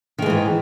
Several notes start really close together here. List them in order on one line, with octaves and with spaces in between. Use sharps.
D#3 G#3 E3 G#2